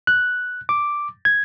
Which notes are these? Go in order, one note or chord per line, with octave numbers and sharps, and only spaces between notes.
F#6
D6
G#6